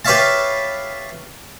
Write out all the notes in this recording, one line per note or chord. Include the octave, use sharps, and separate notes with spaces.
G4 B4 C#5 E5 F5 A5